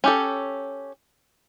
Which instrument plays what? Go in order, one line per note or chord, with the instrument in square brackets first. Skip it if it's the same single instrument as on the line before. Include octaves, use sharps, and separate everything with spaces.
[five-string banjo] C#4 G4 A4